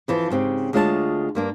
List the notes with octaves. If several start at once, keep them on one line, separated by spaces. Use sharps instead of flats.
F2 E3 F3
G#2 C#3 C4 G4
D2 G#3 F4 C#5 E5 A5
G2 A#3 D4